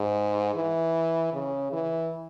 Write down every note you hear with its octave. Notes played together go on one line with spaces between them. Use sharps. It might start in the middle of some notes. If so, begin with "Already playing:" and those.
Already playing: G#2
E3
C#3
E3